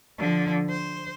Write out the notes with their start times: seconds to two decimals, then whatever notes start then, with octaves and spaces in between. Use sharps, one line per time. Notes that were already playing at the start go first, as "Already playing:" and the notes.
0.19 D3 F3
0.69 C5